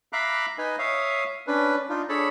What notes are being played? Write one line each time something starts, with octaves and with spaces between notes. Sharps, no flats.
E5 F5 A#5 B5 D6 F#6
D#4 B4 D#5 G#5
C#5 E5 F5 D#6
C#4 D4 B4
D4 D#4 F4
D4 G#4 A4 C#5 A5 B5